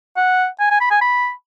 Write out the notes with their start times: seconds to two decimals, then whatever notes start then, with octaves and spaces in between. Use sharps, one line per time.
0.16 F#5
0.60 G#5
0.70 G#5
0.81 B5
0.90 G#5
1.01 B5